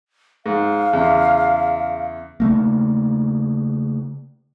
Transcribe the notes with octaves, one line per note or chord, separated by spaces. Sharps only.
G#2 F5
E2 C#3
C#3 A3 A#3